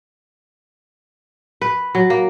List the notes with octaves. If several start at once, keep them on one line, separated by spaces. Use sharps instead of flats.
B4
F#3
A#3